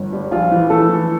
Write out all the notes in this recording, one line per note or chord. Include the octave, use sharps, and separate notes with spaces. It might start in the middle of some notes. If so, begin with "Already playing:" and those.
Already playing: G1
G3
A#1 F3 F4
E3
E3 A3 A4
E3